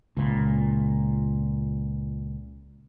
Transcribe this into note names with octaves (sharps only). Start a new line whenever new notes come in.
C#2 A#2